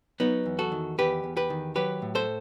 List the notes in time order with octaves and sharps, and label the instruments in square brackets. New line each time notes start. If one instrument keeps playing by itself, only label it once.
[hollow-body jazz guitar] F#3 B3 D#4
E2
F#4 A4
D#3
E2 G4 B4
E2
G4 B4
D#3
F#3 G4 B4
A2
A4 C5